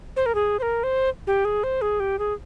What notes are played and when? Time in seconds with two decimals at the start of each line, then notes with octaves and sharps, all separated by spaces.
0.16 C5
0.26 A#4
0.35 G#4
0.59 C5
0.62 A#4
0.83 C5
1.27 G4
1.45 G#4
1.63 C5
1.81 G#4
2.00 G4
2.19 G#4